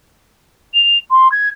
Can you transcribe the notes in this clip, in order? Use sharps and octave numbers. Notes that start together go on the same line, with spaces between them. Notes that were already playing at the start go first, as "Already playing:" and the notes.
F7
C6
G#6